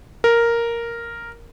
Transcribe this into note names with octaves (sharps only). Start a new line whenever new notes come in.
A#4